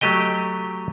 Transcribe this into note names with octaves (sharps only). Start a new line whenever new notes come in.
F#3 A3 G4 D#5 G5